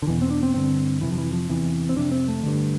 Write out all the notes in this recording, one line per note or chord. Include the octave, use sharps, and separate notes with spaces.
D3
E2 B2 E3
C4
D4
C4
G2 D3 C4
F2 C3 E3
F3
E3
F3
E2 C3 E3
C4
F2 C3 D4
C4
A3
G2 D3